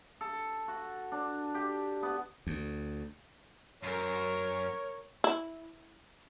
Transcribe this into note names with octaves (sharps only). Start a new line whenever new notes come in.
A4
F#4
D4
G4
B3
D2
F#2 A#4 C#5
E4